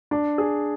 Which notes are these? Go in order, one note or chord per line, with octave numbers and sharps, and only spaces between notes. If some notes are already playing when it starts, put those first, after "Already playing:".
D4
G#4